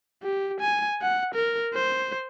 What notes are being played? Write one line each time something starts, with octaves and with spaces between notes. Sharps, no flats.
G4
G#5
F#5
A#4
C5